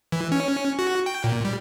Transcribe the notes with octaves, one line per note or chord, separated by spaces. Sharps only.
E3
C#4
F#4
G5
A#2
G3